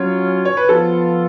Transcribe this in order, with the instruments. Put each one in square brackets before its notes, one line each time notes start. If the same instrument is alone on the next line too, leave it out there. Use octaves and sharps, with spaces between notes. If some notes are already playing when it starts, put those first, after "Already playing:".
Already playing: [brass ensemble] F#3 C#4 F4 [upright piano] C#5
[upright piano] C#5
B4
[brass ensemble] F3 B3 F4 [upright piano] A4